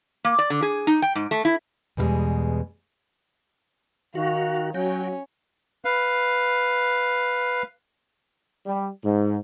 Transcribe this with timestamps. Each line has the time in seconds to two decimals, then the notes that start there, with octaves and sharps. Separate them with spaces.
0.24 A#3
0.39 D5
0.50 D3
0.62 G#4
0.87 D#4
1.02 G5
1.15 G#2
1.31 A3
1.45 E4
1.97 E2 B2 D#3 G3 G#3
4.15 D#3 F#4 F5
4.74 F#3 C#4 F#4 G5
5.85 B4 F5
8.66 G3
9.03 G#2